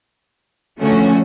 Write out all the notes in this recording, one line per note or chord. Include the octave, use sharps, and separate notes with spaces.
D3 F3 A3 C#4 F#4